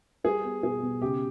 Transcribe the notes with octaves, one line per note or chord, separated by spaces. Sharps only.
G3 G#4
B3
B2 G#4
B2
C#3 G4